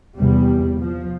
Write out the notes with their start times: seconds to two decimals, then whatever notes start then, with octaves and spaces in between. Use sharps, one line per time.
0.16 E2 C3 G3
0.80 F3